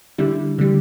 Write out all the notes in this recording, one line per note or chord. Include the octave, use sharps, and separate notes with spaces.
D3 G3 E4
D3 G3